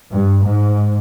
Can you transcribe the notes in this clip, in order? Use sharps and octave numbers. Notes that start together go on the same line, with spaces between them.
G2
G#2